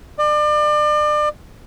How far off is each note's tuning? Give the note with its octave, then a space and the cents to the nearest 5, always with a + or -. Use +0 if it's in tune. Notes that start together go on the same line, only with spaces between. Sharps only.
D5 +35